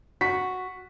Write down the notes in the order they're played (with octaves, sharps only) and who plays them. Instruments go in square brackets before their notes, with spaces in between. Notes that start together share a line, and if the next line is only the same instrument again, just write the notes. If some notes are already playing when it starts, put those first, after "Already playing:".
[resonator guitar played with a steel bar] F#4 [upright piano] B6